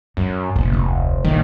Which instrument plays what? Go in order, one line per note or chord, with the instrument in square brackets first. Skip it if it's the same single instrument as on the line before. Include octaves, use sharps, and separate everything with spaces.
[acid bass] F#2 [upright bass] F#3
[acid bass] F1 [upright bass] A#1
[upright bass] D2
[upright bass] A#1 [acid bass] D#3